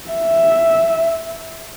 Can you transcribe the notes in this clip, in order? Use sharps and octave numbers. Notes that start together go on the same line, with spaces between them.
E5